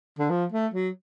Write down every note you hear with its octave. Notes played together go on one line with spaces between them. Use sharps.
D3
F3
A3
F#3